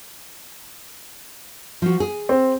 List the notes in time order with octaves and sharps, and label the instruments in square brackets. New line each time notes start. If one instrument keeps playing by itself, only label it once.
[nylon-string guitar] F3 F#4
G#4
[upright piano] C4